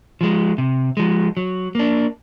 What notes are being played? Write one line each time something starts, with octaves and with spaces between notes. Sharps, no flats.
F3 G#3
C3
F3 G#3
F#3
A#3 D4